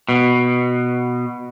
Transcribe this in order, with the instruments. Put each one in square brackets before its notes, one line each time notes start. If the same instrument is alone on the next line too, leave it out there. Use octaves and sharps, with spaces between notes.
[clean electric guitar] B2